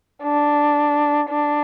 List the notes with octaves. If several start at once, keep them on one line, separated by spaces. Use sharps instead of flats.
D4
D4